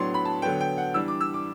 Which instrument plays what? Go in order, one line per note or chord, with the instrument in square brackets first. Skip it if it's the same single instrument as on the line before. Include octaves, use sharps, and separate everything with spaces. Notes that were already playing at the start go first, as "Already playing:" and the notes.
Already playing: [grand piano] A2 F#3 B3 D4 C6
B5
A5
D3 F#3 B3 G5
G5
F#5
E3 G3 D4 E6
D6
E6
D6